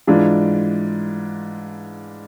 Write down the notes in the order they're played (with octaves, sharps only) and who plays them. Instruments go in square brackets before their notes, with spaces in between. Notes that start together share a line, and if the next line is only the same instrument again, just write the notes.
[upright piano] G#2 E3 G#3 D4 F4